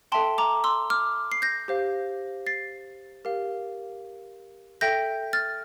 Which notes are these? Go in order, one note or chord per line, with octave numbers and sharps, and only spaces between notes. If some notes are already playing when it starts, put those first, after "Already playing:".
A4 E5 G5 A5 C6
A#5 D6
C6 E6
D6 F6
C7
G6 A#6
G4 C5 F5
A6 C7
G4 A#4 F5
A4 E5 G5 G6 A#6
F6 A6